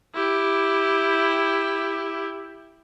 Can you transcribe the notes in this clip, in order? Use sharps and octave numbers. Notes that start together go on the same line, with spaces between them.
E4 G4